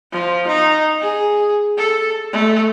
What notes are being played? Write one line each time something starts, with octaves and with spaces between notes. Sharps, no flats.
F3
D#4
G#4
A4
A3